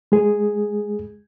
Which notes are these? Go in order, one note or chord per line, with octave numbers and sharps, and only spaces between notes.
G#3 G#4